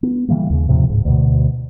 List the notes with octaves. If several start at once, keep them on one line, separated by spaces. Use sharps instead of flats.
B3
C#3 E3 G3 A#3
D#2 C#3
D#2 A2 C3 F3
D1 G#2
D2 B2